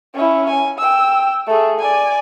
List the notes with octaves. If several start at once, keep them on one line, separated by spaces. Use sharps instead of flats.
C#4 E4
G#5
G5 E6
A3 G#4
D5 G#5